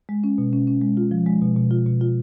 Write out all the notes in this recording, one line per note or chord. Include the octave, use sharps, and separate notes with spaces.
G#3
C#4
B2
C#4
C#4
G#3
F4
F3
G#3
B2
B2
F4
B2
F4